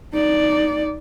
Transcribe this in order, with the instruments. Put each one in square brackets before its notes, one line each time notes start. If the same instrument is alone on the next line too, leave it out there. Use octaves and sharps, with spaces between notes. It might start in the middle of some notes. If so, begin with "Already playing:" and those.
[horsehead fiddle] D#4 D5